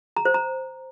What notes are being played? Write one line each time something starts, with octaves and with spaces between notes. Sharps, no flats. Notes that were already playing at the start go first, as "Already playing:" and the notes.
A#5
C5
A#5